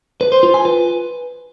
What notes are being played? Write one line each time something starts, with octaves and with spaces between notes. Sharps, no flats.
B4
C5
F4
G#5
B4